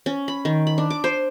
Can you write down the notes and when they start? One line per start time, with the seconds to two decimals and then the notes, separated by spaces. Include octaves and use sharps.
0.06 C#4
0.28 B5
0.45 D#3
0.67 B5
0.78 D4
0.90 D6
1.04 C5